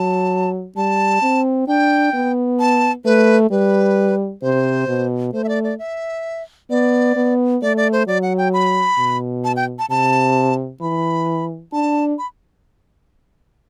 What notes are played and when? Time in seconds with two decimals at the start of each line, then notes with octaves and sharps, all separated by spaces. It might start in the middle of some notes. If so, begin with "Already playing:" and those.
Already playing: F#3 A5
0.76 G3 A5
1.22 C4
1.68 D4 G5
2.13 B3
2.60 A5
3.05 A3 B4
3.51 G3 B4
4.42 C3 C5
4.87 B2
5.33 A3 C5
5.44 E5
5.49 D5
5.64 D5
5.79 E5
6.70 B3 D5
7.16 B3
7.62 A3 D5
7.77 D5
7.92 C5
8.07 F#3 D5
8.23 F#5
8.38 G5
8.53 B5
8.98 B2
9.44 A5
9.56 G5
9.79 A5
9.90 C3 A5
10.81 E3 B5
11.73 D4 A5
12.18 B5